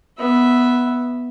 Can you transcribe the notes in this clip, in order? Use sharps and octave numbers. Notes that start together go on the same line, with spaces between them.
B3 E5